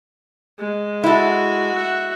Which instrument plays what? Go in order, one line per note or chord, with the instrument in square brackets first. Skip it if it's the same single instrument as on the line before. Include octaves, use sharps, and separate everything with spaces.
[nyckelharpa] G#3
[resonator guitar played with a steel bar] E4 A4 [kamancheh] F#4
[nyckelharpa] E5 F#5